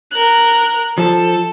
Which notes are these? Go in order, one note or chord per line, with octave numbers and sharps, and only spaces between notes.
A#4 F#6
F3 A4